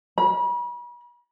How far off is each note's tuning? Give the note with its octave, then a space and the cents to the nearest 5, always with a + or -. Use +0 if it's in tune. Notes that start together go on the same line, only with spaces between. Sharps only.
B5 -40